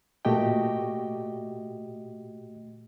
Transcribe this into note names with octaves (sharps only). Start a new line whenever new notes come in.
A#2 A3 F#4 G4 D#5 G5